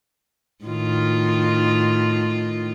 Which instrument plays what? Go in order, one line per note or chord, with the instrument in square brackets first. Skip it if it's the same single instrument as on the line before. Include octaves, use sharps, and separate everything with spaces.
[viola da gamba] A2 D#3 F4